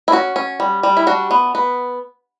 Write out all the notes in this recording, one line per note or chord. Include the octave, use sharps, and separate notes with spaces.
E4
C#4 F#4
C#4
G3
G3
E4
D4 F#4
B3
B3